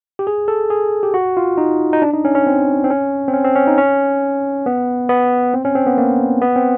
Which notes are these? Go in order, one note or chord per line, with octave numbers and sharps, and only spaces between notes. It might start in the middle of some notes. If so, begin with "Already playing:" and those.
G4
G#4
A4
G#4
G4
F#4
F4
D#4
D#4
D4
D#4
C#4
C#4
C4
C4
C#4
C4
C#4
C4
C#4
D#4
C#4
B3
B3
C4
C#4
C4
B3
A#3
B3
C4